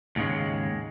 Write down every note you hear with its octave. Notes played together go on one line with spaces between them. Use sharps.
D#2 G#2 C#3 G#3